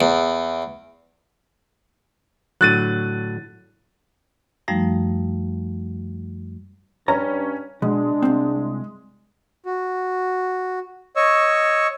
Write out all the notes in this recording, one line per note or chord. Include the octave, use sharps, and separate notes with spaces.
E2
A2 D3 F#3 F#6 A6 D#7
F#2 F3 G3 A3 D#4
G2 C#4 A#5
B2 G#3 D4
C2 C4
F#4
C#5 D#5 C#6 E6